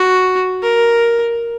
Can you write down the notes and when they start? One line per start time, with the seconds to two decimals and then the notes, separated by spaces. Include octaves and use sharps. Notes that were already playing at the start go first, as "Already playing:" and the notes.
Already playing: F#4
0.63 A#4